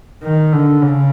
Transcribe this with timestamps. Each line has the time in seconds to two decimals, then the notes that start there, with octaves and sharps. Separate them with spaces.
0.23 D#3
0.53 D3
0.82 C#3